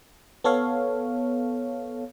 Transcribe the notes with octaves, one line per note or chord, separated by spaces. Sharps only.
B3 A4 C#5 F5